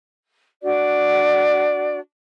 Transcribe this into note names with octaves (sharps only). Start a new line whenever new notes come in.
D4 F#4 D5